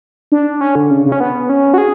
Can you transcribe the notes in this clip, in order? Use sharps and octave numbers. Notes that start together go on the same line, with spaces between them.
D4
C#4
D3
C#3
C#3
C#4
B3
C#4
F#4
G#4